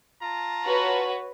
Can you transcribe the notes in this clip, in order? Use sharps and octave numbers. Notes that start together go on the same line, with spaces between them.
F4 A5 A#5
F#4 B4 C#5